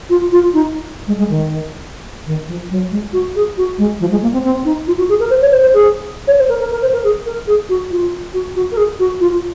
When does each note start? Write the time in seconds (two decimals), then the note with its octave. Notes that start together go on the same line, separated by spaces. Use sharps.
0.10 F4
0.32 F4
0.54 D#4
1.07 G#3
1.18 G#3
1.29 D#3
2.26 D#3
2.48 F3
2.70 F#3
2.91 G#3
3.13 F#4
3.35 G#4
3.57 F#4
3.78 G#3
4.00 F3
4.11 G#3
4.22 A#3
4.33 C4
4.44 C4
4.65 D#4
4.87 F4
4.98 F#4
5.09 G#4
5.20 A#4
5.30 C5
5.41 C#5
5.52 C5
5.62 C5
5.74 G#4
6.27 C#5
6.39 C5
6.49 A#4
6.60 A#4
6.71 A#4
6.82 C5
6.93 A#4
7.04 G#4
7.26 A#4
7.47 G#4
7.69 F#4
7.91 F4
8.33 F#4
8.55 F#4
8.71 A#4
8.77 G#4
8.99 F#4
9.20 F4